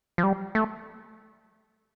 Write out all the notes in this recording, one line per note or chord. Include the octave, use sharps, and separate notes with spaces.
F3
G3
A3